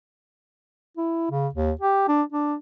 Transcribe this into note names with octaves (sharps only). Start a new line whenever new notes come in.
E4
C#3
D#2
G4
D4
D4